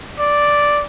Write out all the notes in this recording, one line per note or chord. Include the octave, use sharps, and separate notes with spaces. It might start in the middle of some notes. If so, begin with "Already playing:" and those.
D5